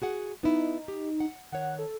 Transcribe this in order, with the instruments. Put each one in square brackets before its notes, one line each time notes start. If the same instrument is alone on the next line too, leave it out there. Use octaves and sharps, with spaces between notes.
[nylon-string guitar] F#4 G#4 F#5
[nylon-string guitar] B3 E4 [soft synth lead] D#4
[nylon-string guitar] G4
F#5
[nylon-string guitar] D#3 C#5 [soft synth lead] F#5
[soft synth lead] A4